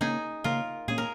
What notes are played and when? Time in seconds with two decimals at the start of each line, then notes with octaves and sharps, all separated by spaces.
0.01 C#3 A#3 C#4 D#4 G#4
0.44 C#3 A#3 C#4 F4 A#4
0.88 A#2 A#3 C#4 G#4
0.98 A#4